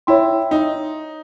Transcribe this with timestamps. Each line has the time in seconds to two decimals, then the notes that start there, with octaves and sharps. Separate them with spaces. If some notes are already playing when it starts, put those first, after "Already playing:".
0.07 E4 C#5 E5 G5 C6
0.51 D#4